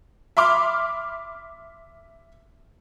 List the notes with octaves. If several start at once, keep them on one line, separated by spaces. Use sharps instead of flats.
E5 B5 C6 D6 F6